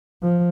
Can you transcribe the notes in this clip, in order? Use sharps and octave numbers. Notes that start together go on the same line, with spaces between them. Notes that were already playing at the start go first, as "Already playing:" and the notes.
F3